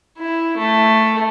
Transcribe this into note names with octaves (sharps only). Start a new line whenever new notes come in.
E4
A3